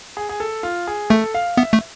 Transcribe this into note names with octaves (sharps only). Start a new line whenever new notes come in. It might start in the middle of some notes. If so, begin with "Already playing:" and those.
G#4
G#4
A4
F4
G#4
A3 A4
F5
B3 E5
A3